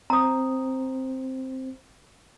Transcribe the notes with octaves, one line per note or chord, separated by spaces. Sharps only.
C4 C5 A#5 D#6